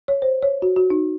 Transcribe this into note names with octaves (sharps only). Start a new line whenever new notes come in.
C#5
C5
C#5
F#4
F#4
D#4